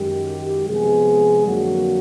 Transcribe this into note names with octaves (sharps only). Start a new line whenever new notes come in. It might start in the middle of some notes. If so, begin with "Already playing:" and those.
Already playing: F#2 D#3 G#3 G4
C3 F3 G#3 B3 G#4
F2 D3 F#3 A#3 F#4